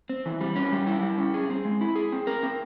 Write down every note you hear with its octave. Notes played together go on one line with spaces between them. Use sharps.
C4
E3
G3
C#4
G3
E4
G3
C#4
G#4
C4
G#3
E4
G#4
C4
A#4
C4